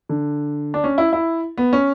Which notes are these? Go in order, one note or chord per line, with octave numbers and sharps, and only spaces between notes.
D3
D4
C#4
E4
E4
B3
C#4